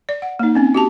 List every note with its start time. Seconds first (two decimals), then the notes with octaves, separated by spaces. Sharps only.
0.09 D5
0.22 F#5
0.39 A#3 D#4
0.55 C4 C#4
0.74 F#4 G4 A5